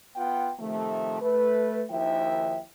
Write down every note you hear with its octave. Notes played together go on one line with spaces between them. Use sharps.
B3 F4 F#5 G5
C3 D#3 F3 A3
A3 B4
D#2 D#3 F3 E4 E5 G5